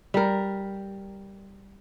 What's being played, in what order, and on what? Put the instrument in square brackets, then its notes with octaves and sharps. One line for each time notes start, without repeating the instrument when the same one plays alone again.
[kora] G3 A#4